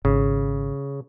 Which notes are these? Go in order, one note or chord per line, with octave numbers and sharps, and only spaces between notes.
G#1 C#3